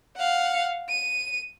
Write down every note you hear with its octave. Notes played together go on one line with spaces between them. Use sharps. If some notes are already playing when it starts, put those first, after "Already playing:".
F5 F#5
D#7